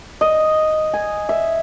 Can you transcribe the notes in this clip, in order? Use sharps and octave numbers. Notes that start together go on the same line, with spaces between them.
D#5
G#5
E5